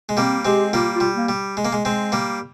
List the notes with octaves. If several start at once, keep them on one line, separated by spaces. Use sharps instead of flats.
G#3
G3 A#3 C4
G#3 C4 G4
G3 A#3 F4
F4
G3
A#3
G3
G#3
A#3
G#3
G#3 C4
G3 A#3